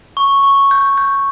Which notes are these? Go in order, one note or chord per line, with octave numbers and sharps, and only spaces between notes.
C#6
C#6
G6
G6